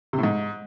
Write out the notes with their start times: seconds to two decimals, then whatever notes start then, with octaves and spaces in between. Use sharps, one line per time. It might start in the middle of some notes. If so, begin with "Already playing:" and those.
0.13 C3
0.18 A2
0.23 G#2